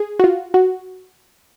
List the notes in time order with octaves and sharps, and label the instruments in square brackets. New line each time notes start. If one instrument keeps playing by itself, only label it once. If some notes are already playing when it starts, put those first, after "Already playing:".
Already playing: [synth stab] G#4
F#4
F4
F#4